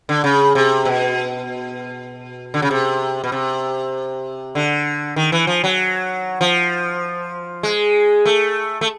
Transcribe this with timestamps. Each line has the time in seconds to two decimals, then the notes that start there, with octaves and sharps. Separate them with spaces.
0.09 D3
0.24 C#3
0.55 C3
0.85 B2
2.54 D3
2.62 C#3
2.71 C3
3.24 B2
3.32 C3
4.55 D3
5.16 D#3
5.32 E3
5.47 F3
5.64 F#3
6.41 F3
7.63 G#3
8.26 A3
8.81 A3